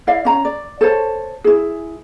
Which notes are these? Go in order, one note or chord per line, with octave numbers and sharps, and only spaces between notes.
E4 D5 E5 F5
C#4 A#5
D5
A4 C5 C#5 A5
E4 G#4